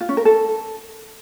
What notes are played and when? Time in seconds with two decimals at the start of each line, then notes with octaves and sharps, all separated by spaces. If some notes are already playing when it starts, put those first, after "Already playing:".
0.01 F4
0.09 C#4
0.17 A#4
0.25 A4